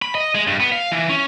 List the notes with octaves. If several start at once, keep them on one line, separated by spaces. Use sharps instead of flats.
B5
D#5
G#3
G2
B3
F5
E3
C#4